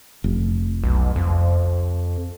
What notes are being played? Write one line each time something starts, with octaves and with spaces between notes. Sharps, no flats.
F1
B1
F2